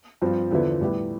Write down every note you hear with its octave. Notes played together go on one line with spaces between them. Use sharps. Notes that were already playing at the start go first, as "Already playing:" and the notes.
G2 F3 C4 F4
E2 D3 F3 B3 E4
A2 G3 B3 E4 G4